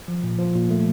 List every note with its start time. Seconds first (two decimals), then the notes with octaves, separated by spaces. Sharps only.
0.08 F3
0.23 A#2
0.39 F3
0.55 A#2
0.70 A3